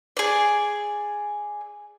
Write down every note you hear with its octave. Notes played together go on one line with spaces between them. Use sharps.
G#4 D5